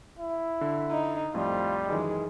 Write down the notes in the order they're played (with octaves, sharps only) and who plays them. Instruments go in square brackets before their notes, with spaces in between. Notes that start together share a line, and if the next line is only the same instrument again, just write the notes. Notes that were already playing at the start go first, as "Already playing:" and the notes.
[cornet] E4
[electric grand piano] D3
[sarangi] D#4
[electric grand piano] F2 A2 F3 [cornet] G3 [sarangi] F4
[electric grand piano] F#2 D#3 E3 [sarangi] G#3